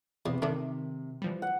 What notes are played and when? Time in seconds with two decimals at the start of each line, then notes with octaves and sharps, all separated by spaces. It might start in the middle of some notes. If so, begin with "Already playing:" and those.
0.26 E2 C3
0.42 D#3 A3 D4
1.22 E3 F3 G3
1.42 F#5